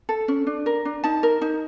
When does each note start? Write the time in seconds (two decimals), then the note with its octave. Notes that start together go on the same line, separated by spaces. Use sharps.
0.09 A4
0.28 C#4
0.47 D4
0.66 A#4
0.85 D4
1.04 D#4 A5
1.23 A#4
1.42 D#4